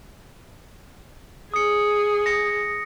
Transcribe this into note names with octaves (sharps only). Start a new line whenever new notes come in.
G#4 D#6 C#7
A#6 C#7